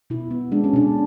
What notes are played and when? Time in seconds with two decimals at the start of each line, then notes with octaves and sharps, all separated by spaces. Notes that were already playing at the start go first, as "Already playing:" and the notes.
0.10 B2 E4
0.31 B3
0.52 G#3 D4
0.64 C#4
0.74 B2 D4